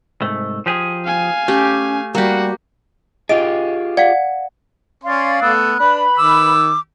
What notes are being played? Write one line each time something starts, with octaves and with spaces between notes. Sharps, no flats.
C2 G#2 A3
F3 G4 G#4
F5 G#5
A3 C#4 G4
G3 A#3 F#4 G4 F#5
F4 G4 G#4 D#5 D7
D5 F5 F#5
C#4 D5 F5 C6
A3 B3 E6 F#6
D4 B4 B5
D#3 D6 E6